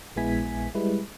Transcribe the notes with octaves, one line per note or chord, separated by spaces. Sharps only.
A#1 G#3 B3 E4 G#5 B6
G3 G#3 E4 B4